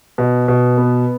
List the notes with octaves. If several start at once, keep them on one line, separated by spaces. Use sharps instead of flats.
B2
B2
B3